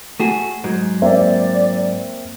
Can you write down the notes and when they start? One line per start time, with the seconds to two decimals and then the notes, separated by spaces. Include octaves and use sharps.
0.20 A3 F#4 G#4
0.64 G#2 F#3 G#3
1.02 A#3 C4 D5 E5